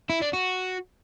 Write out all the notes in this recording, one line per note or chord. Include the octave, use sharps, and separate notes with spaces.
E4
D4
F#4